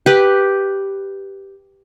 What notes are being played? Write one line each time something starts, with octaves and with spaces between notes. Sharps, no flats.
G4 B4